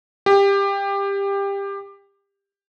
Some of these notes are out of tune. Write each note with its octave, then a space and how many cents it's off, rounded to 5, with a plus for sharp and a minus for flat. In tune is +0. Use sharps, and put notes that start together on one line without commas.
G4 +20